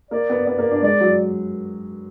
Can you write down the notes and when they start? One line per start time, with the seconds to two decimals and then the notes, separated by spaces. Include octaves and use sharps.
0.11 A#3 D5
0.30 B3
0.47 B3 D5
0.59 A#3
0.71 D4
0.82 G#3 D5
1.01 F#3